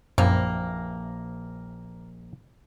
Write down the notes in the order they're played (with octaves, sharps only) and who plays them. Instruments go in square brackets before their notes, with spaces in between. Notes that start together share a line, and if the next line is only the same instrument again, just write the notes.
[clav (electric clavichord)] A#1 [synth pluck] F#2 [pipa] C3 E3 A#3